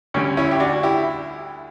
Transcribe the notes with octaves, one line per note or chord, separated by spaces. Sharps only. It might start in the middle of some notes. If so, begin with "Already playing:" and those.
D2 D3 G3 C#4
C#4 E4
G4
D4 F#4
E4 G4